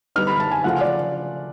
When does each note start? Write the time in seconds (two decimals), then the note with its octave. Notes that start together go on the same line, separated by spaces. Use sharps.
0.16 D3 G3 B3 D#4 F6
0.27 B5
0.40 A5
0.51 G#5
0.64 C#3 F3 A3 C#4 F4 F#5
0.81 D5